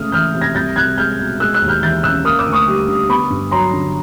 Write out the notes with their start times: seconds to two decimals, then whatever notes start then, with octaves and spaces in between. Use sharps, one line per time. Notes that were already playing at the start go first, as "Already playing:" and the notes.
Already playing: C#2 A3 D#6 F6
0.12 E3 F6 G6
0.34 C3
0.41 G#6 A#6
0.55 C2 G6 A6
0.76 C2 F#6 G#6
0.98 G#3 F6 G6
1.19 B2
1.40 G#3 E6 F#6
1.54 E6 F#6
1.62 D#2
1.68 F6 G6
1.82 E3 G6 A6
2.03 C#3 E6 F#6
2.25 A#3 D#6 F6
2.39 D6 E6
2.46 D2
2.53 C#6 D#6
2.68 G3
2.88 D3
3.09 B3 B5 C#6
3.30 G2
3.51 F#3 A#5 C6
3.73 D3